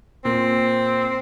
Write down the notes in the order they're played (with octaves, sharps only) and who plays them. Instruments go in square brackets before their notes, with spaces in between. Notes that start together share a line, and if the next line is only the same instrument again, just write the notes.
[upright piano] A#2 [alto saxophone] C4